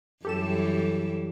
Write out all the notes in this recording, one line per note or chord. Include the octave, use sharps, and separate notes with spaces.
F#2 E3 G3 G4 A4 E7